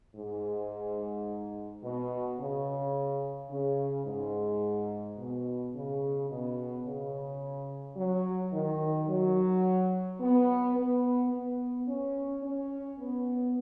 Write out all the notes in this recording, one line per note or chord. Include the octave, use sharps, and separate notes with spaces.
G#2
B2
C#3
C#3
G#2
B2
C#3
B2
C#3
F#3
D#3
F#3
B3
B3
B3
C#4
C#4
B3